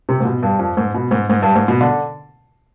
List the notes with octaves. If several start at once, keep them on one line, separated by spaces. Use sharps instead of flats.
C3
G#2
B2
G2
F2
G#2
B2
G#2
G#2
G2
G#2
B2
D3